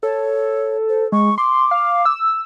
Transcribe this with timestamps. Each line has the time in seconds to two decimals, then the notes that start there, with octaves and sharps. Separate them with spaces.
0.03 A4 C#5
0.89 C5
1.12 G#3 C#6
1.38 C6 D6
1.71 F5
2.05 E6